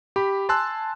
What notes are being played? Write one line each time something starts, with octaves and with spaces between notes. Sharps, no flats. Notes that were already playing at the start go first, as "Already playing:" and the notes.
G4 B5
G#5 A5 C6 E6 F#6